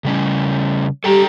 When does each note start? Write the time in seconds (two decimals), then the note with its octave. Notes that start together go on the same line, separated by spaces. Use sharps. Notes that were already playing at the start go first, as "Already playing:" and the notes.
0.04 C#3 G3 C#4
1.04 G3 A4 G5 A#5